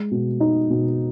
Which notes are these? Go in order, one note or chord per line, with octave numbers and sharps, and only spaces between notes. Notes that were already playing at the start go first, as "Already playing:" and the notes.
Already playing: G#3
B2
D#4
B2